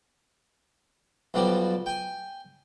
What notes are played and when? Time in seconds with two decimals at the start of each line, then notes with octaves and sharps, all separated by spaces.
1.34 B1 B2 F3 G3 D5
1.86 G5 G#5